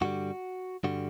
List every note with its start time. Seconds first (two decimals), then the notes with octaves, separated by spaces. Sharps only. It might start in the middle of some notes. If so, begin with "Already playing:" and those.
0.01 G2 D3 G3 F#4
0.84 G2 D3 G3 F#4